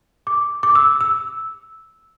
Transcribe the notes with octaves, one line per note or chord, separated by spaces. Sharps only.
D6
D6
E6
E6